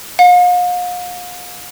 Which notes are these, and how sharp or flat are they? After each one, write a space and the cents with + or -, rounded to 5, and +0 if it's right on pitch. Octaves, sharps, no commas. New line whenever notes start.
F5 +40